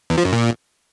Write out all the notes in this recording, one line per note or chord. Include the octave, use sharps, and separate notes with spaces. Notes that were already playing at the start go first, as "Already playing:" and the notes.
E2
F3
F#2
A#2